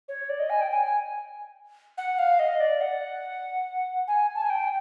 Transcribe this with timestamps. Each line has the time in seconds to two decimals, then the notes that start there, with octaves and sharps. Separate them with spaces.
0.08 C#5
0.29 D5
0.39 D#5
0.50 G#5
0.61 G5
0.71 G#5
0.86 G#5
1.98 F#5
2.19 F5
2.39 D#5
2.60 D5
2.81 F#5
4.08 G#5
4.35 A5
4.42 G#5
4.50 G5